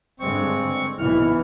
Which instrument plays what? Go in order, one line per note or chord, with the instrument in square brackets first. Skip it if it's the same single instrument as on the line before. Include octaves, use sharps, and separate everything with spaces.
[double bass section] G2 D3 G#3 [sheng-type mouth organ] C4 C#6
[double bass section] B1 B2 E3 [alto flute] E4 [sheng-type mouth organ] F6